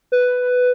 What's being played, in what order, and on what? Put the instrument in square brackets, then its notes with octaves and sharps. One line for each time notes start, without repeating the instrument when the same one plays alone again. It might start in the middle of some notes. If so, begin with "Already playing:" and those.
[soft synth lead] B4